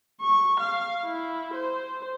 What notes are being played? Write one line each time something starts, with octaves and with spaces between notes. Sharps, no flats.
C#6
F5
E4
C5